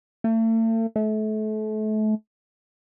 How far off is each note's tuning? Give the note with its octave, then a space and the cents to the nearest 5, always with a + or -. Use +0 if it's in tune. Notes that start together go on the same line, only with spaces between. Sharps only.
A3 +40
A3 -35